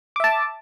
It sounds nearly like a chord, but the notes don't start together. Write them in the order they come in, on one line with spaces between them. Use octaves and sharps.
D6 E5 A5